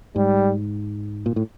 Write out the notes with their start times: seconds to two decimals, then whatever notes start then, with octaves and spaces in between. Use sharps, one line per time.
0.15 G#2 G3
1.26 A#2
1.36 A2